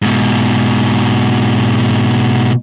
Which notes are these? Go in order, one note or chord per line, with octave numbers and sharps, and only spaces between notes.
G#2 B2